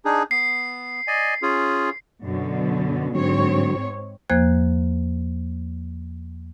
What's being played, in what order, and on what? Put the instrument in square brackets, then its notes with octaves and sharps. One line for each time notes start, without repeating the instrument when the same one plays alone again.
[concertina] D4 D#4 G#4
[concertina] B3 [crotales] C7
[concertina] D5 D#5 G#5
C#4 F4 G#4
[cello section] F#2 B2 D3
[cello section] G#2 C4 C#5 [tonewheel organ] D3 F#3
[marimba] E2 F3 A#3 C5 F#6 G#6